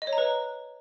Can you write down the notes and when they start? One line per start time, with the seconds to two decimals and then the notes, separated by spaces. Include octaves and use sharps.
0.02 D#5
0.07 C#5
0.13 A#5
0.18 B4